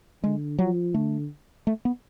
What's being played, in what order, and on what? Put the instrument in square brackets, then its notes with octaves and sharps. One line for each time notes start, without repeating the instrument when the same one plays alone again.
[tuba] D3 [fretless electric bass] G#3
[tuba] F3 [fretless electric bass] F#3
[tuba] D3 [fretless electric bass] A3
[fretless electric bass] A3
B3